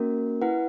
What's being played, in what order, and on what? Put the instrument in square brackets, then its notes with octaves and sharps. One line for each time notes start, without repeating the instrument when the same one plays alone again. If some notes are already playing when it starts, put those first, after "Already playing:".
Already playing: [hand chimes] A#3 C#4 F#4 A#4
E4 B4 F#5